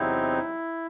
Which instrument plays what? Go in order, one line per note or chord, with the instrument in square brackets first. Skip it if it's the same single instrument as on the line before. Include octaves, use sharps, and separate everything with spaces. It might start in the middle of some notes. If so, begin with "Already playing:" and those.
Already playing: [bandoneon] E2 C3 F#3 C4 D#4 E4